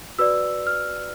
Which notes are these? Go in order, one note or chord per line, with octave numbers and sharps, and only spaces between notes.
F#4 B4 D5 E6
F6